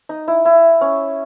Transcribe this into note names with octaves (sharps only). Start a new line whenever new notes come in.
D#4
E4
E4
C#4